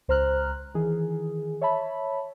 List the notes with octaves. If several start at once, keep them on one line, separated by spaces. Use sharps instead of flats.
C#2 C5 A#5 F6 F#6
D#3 E3 G#4
C#5 E5 A5 B5